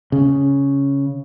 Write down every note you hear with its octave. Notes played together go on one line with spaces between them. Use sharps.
C#3